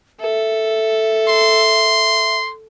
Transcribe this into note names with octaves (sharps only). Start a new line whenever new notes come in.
A4 E5
C6